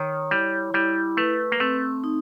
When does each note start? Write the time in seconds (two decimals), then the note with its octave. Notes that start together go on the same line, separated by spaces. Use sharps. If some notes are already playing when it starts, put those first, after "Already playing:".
Already playing: D#3 C#5
0.31 G3 E4
0.74 G3 E4
1.17 A3 B4
1.52 A#3
1.60 A3 C4
2.04 D#4